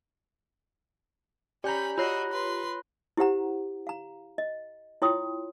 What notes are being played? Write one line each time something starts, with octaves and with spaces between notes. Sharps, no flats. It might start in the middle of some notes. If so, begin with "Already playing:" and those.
C#4 G4 D5 G#5 A#5 B5 G6
F4 F#4 C#5 D#5 B5 F#6 A#6
B4 C6
E4 G4 C5 F#5 A#5
F5 A#5
D#5
E4 F4 C#5 G5 C6 D#6